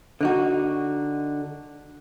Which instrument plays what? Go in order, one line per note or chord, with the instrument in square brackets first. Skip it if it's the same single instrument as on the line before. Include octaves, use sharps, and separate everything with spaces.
[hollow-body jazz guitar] D3 D#4 F#4